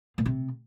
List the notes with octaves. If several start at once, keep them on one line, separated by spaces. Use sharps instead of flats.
A#2
C3